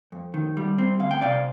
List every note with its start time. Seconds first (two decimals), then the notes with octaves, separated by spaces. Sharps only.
0.12 F2
0.34 D#3
0.57 G3
0.78 C4
1.00 D2 F5
1.11 G5
1.21 C3 D5 F5